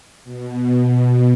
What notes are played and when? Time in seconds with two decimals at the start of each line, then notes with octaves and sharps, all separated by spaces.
0.24 B2